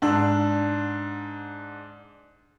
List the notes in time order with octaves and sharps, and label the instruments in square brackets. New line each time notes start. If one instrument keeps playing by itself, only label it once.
[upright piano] G#2 D4 E6